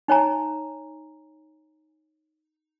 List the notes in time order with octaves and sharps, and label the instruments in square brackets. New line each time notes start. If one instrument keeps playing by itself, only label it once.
[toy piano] D#4 C#5 G#5 A#5